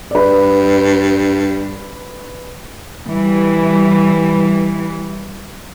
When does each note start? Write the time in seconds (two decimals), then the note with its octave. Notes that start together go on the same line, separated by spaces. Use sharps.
0.11 G2 B4 D5
3.07 E3 G3